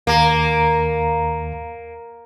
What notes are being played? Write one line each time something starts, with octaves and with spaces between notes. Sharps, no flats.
D#2 A#3 A#5